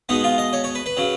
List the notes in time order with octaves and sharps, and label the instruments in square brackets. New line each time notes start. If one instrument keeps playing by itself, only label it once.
[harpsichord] B2 G#3 B3 D#4
F4
D#5
C#5
C#5
B4
B4
C#3 F#3